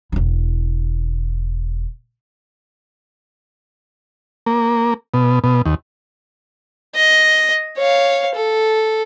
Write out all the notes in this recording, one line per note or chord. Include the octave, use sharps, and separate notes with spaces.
E1 E4
A#3
B2
B2
D#2
D#5
C#5 F5
A4